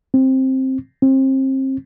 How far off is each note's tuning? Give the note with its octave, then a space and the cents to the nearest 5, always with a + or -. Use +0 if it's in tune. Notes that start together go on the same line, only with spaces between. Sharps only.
C4 +10
C4 +30